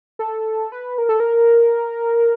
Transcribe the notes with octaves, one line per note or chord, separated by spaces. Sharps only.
A4
B4
A#4
A4
A#4